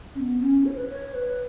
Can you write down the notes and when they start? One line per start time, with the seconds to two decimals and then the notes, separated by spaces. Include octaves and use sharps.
0.15 C#4
0.19 B3
0.40 C#4
0.65 C#5
0.76 B4
0.89 C#5
1.14 B4